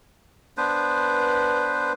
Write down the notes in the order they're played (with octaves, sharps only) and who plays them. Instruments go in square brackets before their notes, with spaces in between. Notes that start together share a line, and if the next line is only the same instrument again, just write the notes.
[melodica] B3 D4 B4 C5